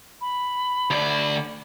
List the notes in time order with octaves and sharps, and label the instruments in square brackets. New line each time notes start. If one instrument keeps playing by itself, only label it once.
[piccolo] B5
[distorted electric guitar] D2 D5